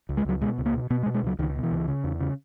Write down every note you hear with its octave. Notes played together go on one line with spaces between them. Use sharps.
C#2
G#3
C#2 F#3
B2 G#3
C#2
A#3
B2
B2 B3
G#3
B2
G#3
C#2 F#3
C#2 D#3
B2
E3
C#2
C#3
E2
C#3